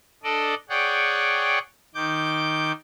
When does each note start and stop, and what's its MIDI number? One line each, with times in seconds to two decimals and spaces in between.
0.23 0.54 62
0.23 0.54 69
0.23 0.54 74
0.23 0.54 75
0.69 1.59 68
0.69 1.59 73
0.69 1.59 74
0.69 1.59 78
0.69 1.59 79
1.95 2.72 51
1.95 2.72 86
1.95 2.72 91